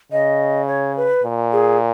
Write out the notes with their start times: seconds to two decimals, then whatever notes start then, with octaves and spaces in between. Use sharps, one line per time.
0.12 C#3 D#5
0.68 C#5
0.97 B4
1.24 A#2
1.52 G#4